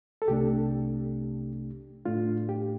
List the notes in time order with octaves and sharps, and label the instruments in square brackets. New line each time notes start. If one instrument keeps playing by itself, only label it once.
[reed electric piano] A4
C2 C3 A3 D4 G4
A2 A3 D4 F4
G4